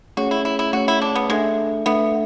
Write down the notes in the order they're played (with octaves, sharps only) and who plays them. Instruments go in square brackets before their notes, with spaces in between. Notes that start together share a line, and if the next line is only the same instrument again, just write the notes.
[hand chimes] A3 C#4 G#4 C#5 [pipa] F#4
[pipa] E4
E4
E4
[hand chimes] A3 C#4 G#4 C#5 [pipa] F#4
[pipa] E4
D4
B3
[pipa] G#3 [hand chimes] A3 D4 A4 E5
[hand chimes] A3 D4 A4 E5 [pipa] B3